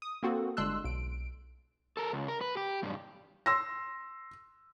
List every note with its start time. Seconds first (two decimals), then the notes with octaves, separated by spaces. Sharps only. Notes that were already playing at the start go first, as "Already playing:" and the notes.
0.02 D#6
0.23 A#3 C4 F#4 A4
0.57 G1 G#3 D4 C6 E6 F#6
0.84 B1 D7
1.97 A4 A#4
2.13 C#2
2.28 A#4
2.41 B4
2.57 G4
2.83 B1 G2
3.46 C6 E6 A#6